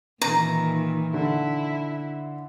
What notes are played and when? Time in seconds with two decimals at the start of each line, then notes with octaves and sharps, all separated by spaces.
0.22 A#2 D#3 E3 A#5
1.14 D3 E4